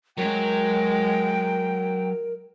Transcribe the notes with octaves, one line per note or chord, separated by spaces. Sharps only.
F#3 G#3 A#4 C#5 G5